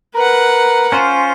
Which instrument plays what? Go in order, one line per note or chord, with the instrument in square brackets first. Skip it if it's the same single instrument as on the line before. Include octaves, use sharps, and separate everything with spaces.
[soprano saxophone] A#4 [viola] B4 F#5
[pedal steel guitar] C#4 F4 [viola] C5